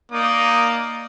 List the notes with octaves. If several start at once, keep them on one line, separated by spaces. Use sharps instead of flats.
A#3 D#4 D5 D#6